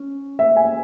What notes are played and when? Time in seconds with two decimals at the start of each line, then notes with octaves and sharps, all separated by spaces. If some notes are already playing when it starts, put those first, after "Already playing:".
Already playing: C#4
0.39 E5
0.57 G#5